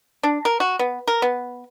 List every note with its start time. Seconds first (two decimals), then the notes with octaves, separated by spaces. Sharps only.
0.23 D4
0.45 A#4
0.60 F#4
0.79 B3
1.08 A#4
1.22 B3